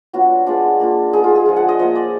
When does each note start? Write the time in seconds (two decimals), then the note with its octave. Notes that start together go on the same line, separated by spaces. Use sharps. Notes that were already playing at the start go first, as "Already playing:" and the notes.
0.13 F#3 B3 D4 F4 F#4
0.46 G#3 B3 D4 F4
0.80 A#3 D4 F4
1.13 G#3 B3 D#4 G#4
1.24 F4
1.35 G#4
1.46 F3 G#3 D4 F4
1.56 F#5
1.69 D#5
1.79 F3 A#3 F4 D#5
1.96 D5